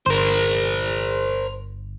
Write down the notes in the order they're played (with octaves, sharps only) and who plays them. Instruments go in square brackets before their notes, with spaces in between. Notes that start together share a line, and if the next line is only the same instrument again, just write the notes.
[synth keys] G1 [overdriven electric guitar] A#4 C5